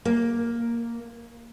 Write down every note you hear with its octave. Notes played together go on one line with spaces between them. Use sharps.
A#3